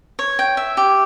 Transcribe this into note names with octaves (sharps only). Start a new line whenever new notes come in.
C#5
G5
E5
G4